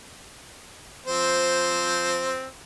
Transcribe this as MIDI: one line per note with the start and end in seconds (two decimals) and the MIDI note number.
1.06 2.46 53
1.06 2.46 60
1.06 2.46 72